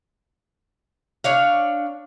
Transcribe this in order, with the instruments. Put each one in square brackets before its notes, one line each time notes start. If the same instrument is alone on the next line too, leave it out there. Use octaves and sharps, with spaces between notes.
[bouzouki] D4 C#5 F5